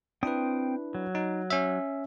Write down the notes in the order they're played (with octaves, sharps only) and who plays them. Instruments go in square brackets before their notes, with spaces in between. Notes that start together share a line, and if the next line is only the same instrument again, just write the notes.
[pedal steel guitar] C4 G5 D#6 [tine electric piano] D4 E4 B4
[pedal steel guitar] F#3
[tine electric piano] D#4
C#4 E5